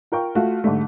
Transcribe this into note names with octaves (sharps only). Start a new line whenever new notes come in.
F4 A#4 G5 C#6
A3 F4 F#4
G#2 D3 G3 A3